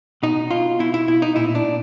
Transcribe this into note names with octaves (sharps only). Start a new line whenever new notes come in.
B2 D#4
B2 F4
B2 E4
E4
B2 E4
D#4
A#2 E4
D4
A#2